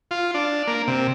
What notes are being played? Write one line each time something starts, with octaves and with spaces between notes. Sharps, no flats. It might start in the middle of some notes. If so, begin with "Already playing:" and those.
F4
D4
A#3
C3